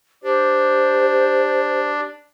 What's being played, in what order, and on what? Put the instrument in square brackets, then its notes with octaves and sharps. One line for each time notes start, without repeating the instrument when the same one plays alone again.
[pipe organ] D4 [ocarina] G4 [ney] C5